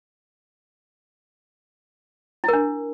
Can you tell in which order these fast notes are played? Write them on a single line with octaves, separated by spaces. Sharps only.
E4 A#4 D4